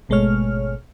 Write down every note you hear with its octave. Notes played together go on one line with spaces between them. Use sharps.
G#1 B2 G#3 A3 C#5 F6